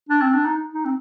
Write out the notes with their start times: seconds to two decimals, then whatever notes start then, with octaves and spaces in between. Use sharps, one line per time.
0.09 D4
0.22 C4
0.34 D4
0.45 D#4
0.74 D#4
0.85 C4